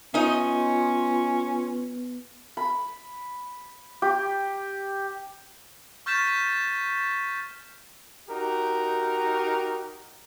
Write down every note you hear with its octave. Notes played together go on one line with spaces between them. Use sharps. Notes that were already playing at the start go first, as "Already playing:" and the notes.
B3 C#4 D#4 F4 D#5
B5
G4
C#6 F6 G6 A6 B6 E7
D#4 F#4 G4 A#4